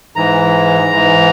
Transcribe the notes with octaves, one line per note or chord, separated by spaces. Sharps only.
G#2 E3 A#5
G#2 E3